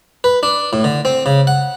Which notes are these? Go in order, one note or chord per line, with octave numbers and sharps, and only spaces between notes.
B4
D4
A2
D3
C4
C#3
F#5